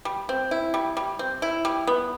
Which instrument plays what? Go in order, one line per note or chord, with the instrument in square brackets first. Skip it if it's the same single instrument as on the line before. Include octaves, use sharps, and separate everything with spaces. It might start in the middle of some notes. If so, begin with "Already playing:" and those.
[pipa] G3
C4
E4
G3
G3
C4
E4
G3
B3